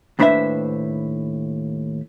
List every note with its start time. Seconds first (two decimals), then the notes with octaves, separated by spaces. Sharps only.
0.19 D#2 A2 D4 B4 C5 E5